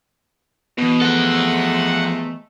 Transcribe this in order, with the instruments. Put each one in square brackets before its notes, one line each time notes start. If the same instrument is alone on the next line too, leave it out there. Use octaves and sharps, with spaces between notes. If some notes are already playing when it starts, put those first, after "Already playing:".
[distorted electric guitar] B2 [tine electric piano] E3 B3
[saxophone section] C3 G#3 A3 [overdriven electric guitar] F3 A4 [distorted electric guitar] F#5